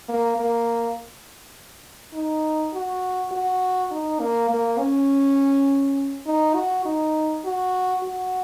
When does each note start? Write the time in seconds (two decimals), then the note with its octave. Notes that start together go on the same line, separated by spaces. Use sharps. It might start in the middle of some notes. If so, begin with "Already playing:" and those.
0.09 A#3
0.37 A#3
2.13 D#4
2.74 F#4
3.32 F#4
3.91 D#4
4.20 A#3
4.49 A#3
4.79 C#4
6.26 D#4
6.55 F#4
6.85 D#4
7.45 F#4
8.04 F#4